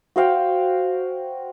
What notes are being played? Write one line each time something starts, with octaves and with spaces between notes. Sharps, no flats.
F#4 C5 F5 G5